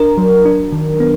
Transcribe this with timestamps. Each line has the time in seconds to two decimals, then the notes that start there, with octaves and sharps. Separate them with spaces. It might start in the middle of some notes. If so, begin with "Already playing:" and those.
Already playing: D4 A#4
0.18 F#3
0.45 D4
0.72 D#3
1.00 B3